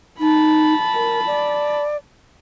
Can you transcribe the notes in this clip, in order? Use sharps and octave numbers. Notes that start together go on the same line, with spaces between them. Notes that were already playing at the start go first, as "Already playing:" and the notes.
D#4 A5 B5
A#4
D5